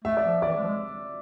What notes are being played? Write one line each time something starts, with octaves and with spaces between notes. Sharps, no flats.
A3 E5
D5
F3
E3 D5
G#3
F3
G#3